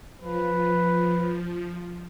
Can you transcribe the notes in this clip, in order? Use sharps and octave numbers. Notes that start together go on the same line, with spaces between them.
F3 B4